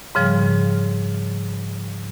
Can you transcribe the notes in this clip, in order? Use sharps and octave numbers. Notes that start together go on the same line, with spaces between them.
G#2 C#3 F3 G3